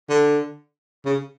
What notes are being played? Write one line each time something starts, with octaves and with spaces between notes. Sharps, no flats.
D3
C#3